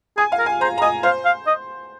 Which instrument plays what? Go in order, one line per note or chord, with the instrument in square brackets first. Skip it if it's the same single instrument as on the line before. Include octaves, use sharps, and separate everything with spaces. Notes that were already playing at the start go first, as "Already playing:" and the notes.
[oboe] G#4 [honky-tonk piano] G#5
[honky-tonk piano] F5
[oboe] A#4
[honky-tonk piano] G#5
[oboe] C5 [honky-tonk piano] A#5
[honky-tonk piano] A#5
[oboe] D#5 [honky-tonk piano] G#5
[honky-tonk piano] C5 [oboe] F5
[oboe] F5
D#5